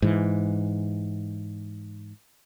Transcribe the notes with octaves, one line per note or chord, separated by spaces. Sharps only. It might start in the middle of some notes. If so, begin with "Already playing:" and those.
G#2 E3